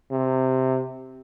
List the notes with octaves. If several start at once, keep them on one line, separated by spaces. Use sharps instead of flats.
C3